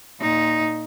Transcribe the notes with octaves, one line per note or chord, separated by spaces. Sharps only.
A#2 D#4